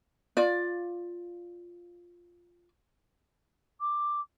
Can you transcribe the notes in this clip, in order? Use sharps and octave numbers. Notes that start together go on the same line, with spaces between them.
F4 D5
D6